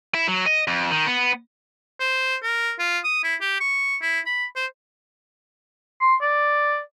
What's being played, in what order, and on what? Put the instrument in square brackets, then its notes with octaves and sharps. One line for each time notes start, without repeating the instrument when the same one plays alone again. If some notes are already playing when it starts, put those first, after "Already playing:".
[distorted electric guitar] E4
F#3
D#5
F2
D#3
B3
[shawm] C5
A#4
F4
D#6
E4
G4
C#6
E4
B5
C5
[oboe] C6
D5